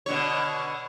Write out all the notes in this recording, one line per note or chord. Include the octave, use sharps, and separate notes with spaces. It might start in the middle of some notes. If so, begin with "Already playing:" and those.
B2 D3 C#5